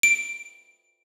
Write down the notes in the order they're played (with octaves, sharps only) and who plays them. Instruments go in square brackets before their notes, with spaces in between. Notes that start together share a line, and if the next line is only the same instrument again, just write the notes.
[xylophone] D7